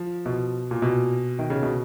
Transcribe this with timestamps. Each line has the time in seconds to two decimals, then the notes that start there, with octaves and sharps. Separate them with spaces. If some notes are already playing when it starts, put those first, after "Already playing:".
Already playing: F3
0.26 B2
0.71 A#2
0.82 B2
1.39 D#3
1.50 C#3
1.63 B2